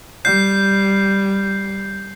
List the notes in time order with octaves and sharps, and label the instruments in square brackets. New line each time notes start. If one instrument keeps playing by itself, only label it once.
[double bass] G3 [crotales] G6 C7